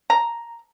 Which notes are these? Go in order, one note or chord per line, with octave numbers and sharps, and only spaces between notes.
A#5